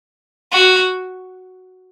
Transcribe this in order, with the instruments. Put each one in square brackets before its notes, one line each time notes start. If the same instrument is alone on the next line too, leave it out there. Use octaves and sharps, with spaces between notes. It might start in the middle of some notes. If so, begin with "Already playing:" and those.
[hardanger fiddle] F#4